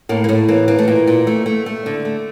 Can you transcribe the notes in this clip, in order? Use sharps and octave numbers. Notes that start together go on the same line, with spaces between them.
A2 A#3
A#3
A2 A3
E3 A#3
E3 A#3
A3
A#2 A#3
A#2
A3
A3
A3
D3
A3